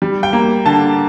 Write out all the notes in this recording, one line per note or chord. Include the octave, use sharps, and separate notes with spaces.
G3
G5
A#3
D3 A5